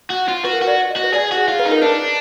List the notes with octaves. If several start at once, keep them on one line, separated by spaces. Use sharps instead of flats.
F#4
F4
F#4 B4
A#4
F#4 B4
D5
D#5
F#4
B4
G#4 D5
F#4 G#4
F4
B4
D#4
A#4
D4 B4